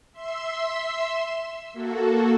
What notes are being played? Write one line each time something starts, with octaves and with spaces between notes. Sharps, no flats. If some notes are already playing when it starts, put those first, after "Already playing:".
E5 C6 E6
A#3 F#4 A4